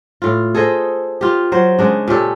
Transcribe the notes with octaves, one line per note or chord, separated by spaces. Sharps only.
A2 F4
G#4 A4 C5 D#5
F4 G4
F#3 C5
C#3 G#3 D4
A#2 C#4 G4 A4